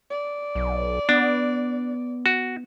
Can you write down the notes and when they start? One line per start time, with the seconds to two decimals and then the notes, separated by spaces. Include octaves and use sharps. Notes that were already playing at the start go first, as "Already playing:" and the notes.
0.10 D5
0.55 B1
1.09 B3 D4
2.26 F#4